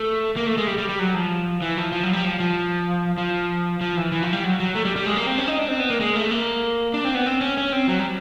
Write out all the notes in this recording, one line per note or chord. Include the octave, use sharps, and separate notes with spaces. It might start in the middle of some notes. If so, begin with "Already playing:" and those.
Already playing: A3
A#3
A3
G#3
G3
G3
G3
F#3
F3
E3
F3
F3
F#3
G3
F3
F3
F3
F3
E3
E3
F3
G3
F#3
F#3
A3
G3
G3
G#3
A#3
C4
C#4
D#4
D4
C4
B3
A#3
G#3
A3
A#3
D4
C4
B3
C4
C#4
C#4
C4
F#3
G3